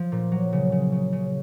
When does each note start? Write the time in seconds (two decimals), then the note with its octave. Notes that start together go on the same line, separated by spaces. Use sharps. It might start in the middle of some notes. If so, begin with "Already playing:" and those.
Already playing: F3
0.12 A#2
0.32 F#3
0.53 C#3
0.72 C#3
0.92 C#3
1.12 C#3